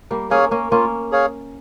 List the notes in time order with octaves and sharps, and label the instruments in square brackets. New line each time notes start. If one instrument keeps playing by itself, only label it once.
[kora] G3 A#3
[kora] A#3 C#4 [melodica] G#4 C#5 F5
[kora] A#3 C#4
[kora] A#3 C#4 [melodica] F4
[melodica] G#4 C#5 F5